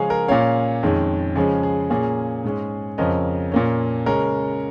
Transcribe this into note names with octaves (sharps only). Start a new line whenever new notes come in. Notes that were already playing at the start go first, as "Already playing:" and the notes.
Already playing: C#3 F3 G#3 C#4 G#4 C#5 F5
A#4
A#2 A#3 C#4 C#5 F5
F2 D#3 G#3 C#4
C#3 F3 G#3 C#4 G#4
G#4
A#2 A#3 C#4 G#4
G#2 G#3 C#4
F2 C#3 F3 C#4 A#4 D#5
A#2 A#3 C#4
C#3 G#3 C#4 A#4